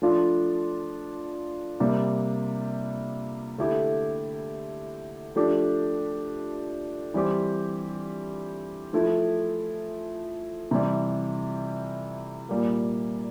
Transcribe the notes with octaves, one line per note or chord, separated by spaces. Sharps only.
F3 A3 D4 F4
C3 G3 A#3
D3 A3 E4 G4
F3 A3 D4 G4
E3 G3 C4 G4
F3 A3 E4
C3 E3 G3
A#2 G3 A#3